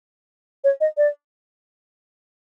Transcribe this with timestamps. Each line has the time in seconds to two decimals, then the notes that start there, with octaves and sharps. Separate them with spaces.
0.64 C#5
0.81 D#5
0.97 D5